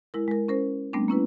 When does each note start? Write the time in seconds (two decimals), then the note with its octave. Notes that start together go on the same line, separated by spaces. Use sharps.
0.14 G#3 E4 A#4
0.28 G#3 A#4
0.48 C#4 A#4 C5
0.93 G3 A3 B3 C4 D4
1.08 A#3 C#4 E4 B4